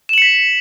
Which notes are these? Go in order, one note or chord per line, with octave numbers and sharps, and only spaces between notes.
B6 C#7 E7 F#7